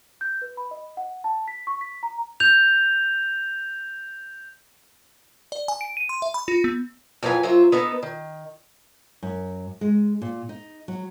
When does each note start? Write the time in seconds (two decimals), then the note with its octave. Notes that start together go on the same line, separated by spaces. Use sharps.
0.21 G6
0.42 B4
0.57 B5
0.71 D#5
0.97 F#5
1.24 A5
1.48 B6
1.67 C#6
1.81 B6
2.03 A#5
2.40 G6 F7
5.52 D5
5.68 G#5
5.81 D7
5.97 D#7
6.09 C6
6.22 E5
6.34 B5
6.48 F4
6.64 B3
7.23 F2 A2 F#3 A4 B4 G#5
7.43 F#3 F4 C5 E5
7.72 B3 D#4 A4 B4
8.03 D#3
9.23 F#2
9.81 G#3
10.22 A#2
10.49 D#4
10.88 F#3